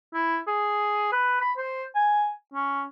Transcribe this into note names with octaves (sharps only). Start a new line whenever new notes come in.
E4
G#4
B4
B5
C5
G#5
C#4